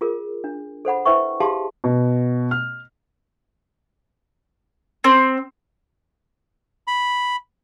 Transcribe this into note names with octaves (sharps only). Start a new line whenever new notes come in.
F4 G#4 A#4
D4
A4 C5 F#5 B5
E4 B4 C5 E5 G5 C#6
G4 G#4 F5 A5 B5 C6
B2
F6
C4
B5